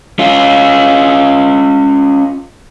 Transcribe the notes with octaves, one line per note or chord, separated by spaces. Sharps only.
C#4 F4